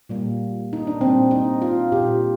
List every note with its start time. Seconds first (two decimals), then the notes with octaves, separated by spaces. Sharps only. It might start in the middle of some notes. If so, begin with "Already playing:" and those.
0.09 A#2 G3 A#3
0.73 D#4
0.87 D4
1.01 A#2 G3 A#3 C4
1.31 D#4
1.62 F4
1.92 A#2 G3 A#3 G4